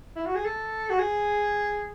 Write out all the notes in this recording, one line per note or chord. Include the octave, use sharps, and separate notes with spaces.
E4
F#4
G#4
A4
F#4
G#4